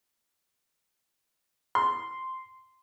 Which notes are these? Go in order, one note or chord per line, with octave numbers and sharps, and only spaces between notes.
C6